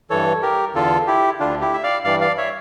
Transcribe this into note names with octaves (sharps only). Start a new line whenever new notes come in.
G2 E3 A4 C#5
G4 A#4
E2 D3 F4 A4
E4 G4
D2 D3 D4 F4
E4 G4
E5
D5 F5
G2 E3 D5 F5
D5 F5
C#5 E5